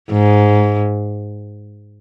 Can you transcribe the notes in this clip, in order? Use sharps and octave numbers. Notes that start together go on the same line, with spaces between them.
G#2